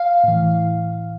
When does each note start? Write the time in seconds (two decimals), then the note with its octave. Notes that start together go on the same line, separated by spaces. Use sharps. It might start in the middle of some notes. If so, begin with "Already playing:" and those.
Already playing: F5
0.24 A2 E3